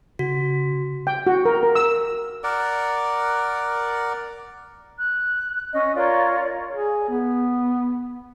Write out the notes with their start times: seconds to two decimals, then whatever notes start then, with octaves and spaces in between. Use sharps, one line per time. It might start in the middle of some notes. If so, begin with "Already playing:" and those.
0.19 C#3 F#4
1.07 G5
1.27 F#4
1.45 A#4
1.63 A#4
1.75 E6
2.44 A#4 D5 F#5
4.99 F#6
5.74 C#4 D#5
5.95 F4 A#4 C#5 D5
6.71 G#4
7.09 B3